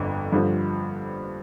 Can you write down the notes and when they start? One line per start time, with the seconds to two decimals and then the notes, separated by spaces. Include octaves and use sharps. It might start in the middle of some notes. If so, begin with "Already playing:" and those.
Already playing: G1 F2 D3 D4
0.32 G2 D3 F3